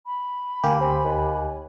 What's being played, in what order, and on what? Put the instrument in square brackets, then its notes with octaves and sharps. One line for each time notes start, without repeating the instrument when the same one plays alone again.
[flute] B5
[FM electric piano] D2 G4 [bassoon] A#3 [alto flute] G#5
[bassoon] C4 [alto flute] G#5
[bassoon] D#2